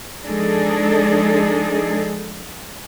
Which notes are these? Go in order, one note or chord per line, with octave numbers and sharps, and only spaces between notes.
F3 G#3 D4 D#4 G#4 A4